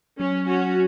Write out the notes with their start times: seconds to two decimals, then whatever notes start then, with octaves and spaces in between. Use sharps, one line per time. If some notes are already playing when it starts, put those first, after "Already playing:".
0.19 F#3 C#4
0.48 C#4 F#4